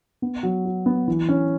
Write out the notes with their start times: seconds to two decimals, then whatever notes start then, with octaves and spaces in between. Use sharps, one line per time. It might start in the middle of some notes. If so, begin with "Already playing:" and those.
0.22 B3
0.43 F#3
0.65 F#4
0.86 B3
1.08 E3
1.29 C#4